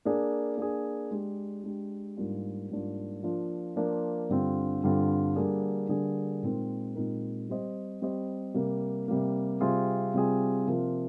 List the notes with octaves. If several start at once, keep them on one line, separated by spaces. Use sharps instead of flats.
A#3 D4 G#4
A#3 D4 G#4
G#3 D4 G4
G#3 D4 G4
G#2 G3 A#3 D4 F4
G#2 G3 A#3 D4 F4
F3 A#3 D4 F4
F3 A#3 D4 F4
G2 D3 G3 C4 F4
G2 D3 G3 C4 F4
D3 G3 A#3 D4 G#4
D3 G3 A#3 D4 G#4
A#2 G#3 C4 D#4 A#4
A#2 G#3 C4 D#4 A#4
G3 C4 G4 C5 D#5
G3 C4 G4 C5 D#5
C3 G3 A#3
C3 G3 A#3
C3 G3 C4 F4 G#4
C3 G3 C4 F4 G#4
C3 F3 A#3 F4 A#4